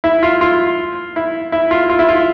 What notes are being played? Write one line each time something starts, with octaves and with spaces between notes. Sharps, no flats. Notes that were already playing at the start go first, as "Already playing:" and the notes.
E4
F4
F4
E4
E4
F4
F4
E4
F4